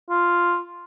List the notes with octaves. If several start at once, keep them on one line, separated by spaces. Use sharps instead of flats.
F4